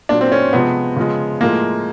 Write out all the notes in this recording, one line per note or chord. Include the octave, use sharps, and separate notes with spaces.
A#2 F#3 D4
C4
C#4
C3 F3 G#3 B3
C#3 F3 G#3
A2 F3 G#3 A#3